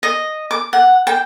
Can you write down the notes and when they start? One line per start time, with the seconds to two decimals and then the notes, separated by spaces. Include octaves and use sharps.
0.03 D#5
0.51 D6
0.73 F#5
1.07 G5